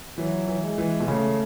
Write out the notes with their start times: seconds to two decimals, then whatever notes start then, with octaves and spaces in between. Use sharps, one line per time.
0.18 E3 F#3
0.48 E3
0.63 G#3
0.78 E3
1.00 B2
1.08 C#3 A3